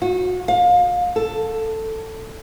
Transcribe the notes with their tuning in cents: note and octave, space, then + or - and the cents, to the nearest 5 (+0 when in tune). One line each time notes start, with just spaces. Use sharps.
F#4 -25
F5 +30
A4 +10